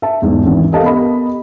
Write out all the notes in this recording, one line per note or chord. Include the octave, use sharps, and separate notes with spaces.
E5 A5
E2 G#2
G#1 E3
G4 A4 A#4 D#5 F5 A5
B3 G4 A#4 D#5 B5